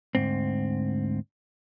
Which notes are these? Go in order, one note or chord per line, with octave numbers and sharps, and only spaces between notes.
D2 G#2 C4